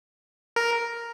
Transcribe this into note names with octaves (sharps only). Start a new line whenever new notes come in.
A#4